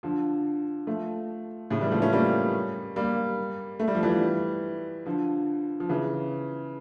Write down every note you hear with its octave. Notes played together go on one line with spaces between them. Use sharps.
D3 F3
F3 A3
A2 C#3
E3 G3
F3 A3
A3 C#4
G3 A#3
G3 A#3
A3
G3
F3
E3 G3
D3 F3
F3
C#3 E3